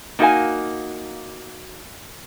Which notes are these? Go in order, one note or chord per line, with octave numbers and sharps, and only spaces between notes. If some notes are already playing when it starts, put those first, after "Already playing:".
A#3 D#4 F#4 A4 F5 G#5